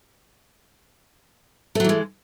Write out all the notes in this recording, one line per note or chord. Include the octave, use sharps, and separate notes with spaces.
E3 F#3 G#3 A3